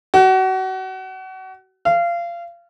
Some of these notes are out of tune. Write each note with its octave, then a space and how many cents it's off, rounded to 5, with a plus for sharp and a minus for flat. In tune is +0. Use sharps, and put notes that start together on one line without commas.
F#4 +30
F5 -25